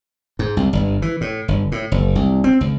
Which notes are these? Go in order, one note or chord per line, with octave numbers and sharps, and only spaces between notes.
G#2
C2
G1
E3
A2
G1
A2
F#1
C2
C4
C#2